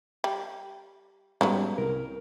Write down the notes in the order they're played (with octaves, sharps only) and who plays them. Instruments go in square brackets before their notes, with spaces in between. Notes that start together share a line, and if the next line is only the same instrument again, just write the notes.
[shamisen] G3
[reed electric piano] G#2 G3 [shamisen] C#3 F#3 B3
[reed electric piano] C2 A#4